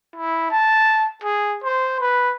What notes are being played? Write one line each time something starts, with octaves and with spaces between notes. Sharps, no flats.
E4
A5
G#4
C5
B4